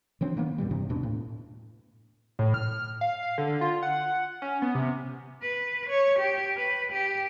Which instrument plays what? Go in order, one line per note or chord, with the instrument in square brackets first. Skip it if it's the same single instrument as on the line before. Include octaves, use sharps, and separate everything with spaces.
[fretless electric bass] E3 F#3 C4 D4
D#3 A#3 B3
F2 A#2 E3 G3
G2 C3
D#2 B2 D4
A2
[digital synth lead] A2
F6
F5
F5
D3
F4
F#5
C#4
B3
C3
[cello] B4
C#5
G4
B4
G4